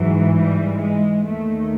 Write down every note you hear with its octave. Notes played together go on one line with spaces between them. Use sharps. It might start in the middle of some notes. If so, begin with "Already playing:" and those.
Already playing: G#2 E3 F#3
G3
G#3
D#2 D#3 A3